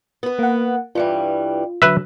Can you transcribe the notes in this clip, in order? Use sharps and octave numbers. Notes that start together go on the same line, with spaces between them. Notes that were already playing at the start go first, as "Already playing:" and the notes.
B3 B4
A#3 F#5
G2 E3 G3 F4
D3 F#3 B4 E5